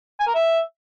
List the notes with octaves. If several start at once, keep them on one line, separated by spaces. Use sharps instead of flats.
G#5
A#4
E5